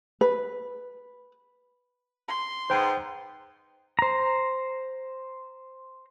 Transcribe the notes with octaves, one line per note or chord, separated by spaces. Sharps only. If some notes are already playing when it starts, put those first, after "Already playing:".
B4
C6
G#2 B3 C5 G5
C5 A#5